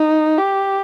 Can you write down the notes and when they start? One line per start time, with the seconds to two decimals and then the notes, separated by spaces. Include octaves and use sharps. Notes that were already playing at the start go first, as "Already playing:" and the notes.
Already playing: D#4
0.38 G4